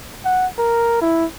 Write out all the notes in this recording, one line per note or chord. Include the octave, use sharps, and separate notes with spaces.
F#5
A#4
E4